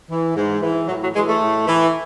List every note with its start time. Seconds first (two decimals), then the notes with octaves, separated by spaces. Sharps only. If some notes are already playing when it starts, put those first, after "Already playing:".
0.09 E3
0.35 G#2
0.62 E3
0.87 A2 F#3
1.01 F#3
1.14 E3 G#3
1.27 A3
1.41 A2
1.67 E3